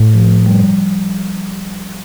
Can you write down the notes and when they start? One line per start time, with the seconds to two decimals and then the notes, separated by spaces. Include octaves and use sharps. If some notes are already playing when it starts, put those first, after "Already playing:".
Already playing: A2
0.14 F3
0.46 G3